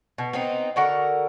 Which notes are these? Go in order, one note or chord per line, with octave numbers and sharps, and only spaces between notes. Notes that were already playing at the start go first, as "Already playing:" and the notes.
B2
B3 C4 D#4
D3 F#4 A#4 F#5